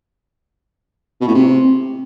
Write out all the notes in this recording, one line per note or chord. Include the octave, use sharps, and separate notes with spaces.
B2
A2
C3